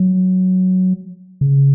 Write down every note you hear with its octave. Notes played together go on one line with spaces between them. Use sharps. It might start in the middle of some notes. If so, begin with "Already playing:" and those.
Already playing: F#3
C#3